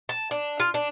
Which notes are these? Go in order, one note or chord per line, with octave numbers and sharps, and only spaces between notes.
A5
D4
F4
D4